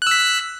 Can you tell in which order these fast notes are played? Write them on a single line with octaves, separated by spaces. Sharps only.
F#6 E6 B6